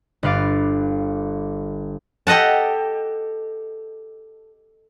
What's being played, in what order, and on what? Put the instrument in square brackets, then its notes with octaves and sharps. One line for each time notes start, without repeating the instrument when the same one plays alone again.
[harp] G1 B4 F5 D6 A6
[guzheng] G4 A4 D#5 F#5 A5